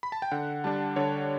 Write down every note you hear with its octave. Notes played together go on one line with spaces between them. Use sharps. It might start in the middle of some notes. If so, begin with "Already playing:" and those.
B5
A5
G5
D3 F#5
G3 D4 A5
D3 C#5